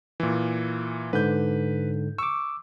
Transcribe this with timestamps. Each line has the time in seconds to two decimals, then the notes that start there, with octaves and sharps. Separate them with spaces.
0.20 A#2 E3
1.13 G#2 D3 B4 G6
2.18 C#6 D6 E6